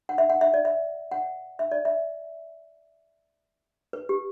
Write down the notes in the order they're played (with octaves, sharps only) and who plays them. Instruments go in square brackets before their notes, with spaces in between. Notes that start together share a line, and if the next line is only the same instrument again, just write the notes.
[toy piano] F#5
E5
F#5
E5
D5
E5
F#5
E5
D5
E5
B4
G4